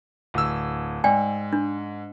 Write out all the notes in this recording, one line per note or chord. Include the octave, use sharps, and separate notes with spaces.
D1 E6
G#2 D5 G5 G#5
D4